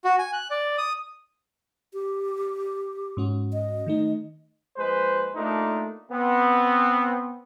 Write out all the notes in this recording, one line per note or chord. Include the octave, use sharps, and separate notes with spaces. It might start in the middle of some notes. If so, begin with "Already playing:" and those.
F#4
G#5
F#6
D5
D#6
G4
G#2 C#4 F#4
D#5
D#3 A3 D#4
A#1 G#3 B4 C5
A3 A#3 D4 D#4 F4
B3 C4